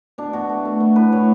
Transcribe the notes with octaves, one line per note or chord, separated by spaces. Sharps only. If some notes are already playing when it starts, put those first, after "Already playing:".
B2 D4
B2 F#4
A3
A3
B3
A2 B4
A2 C#5